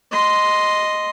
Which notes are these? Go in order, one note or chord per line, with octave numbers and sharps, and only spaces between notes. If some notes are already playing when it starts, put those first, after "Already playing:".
D#5 C6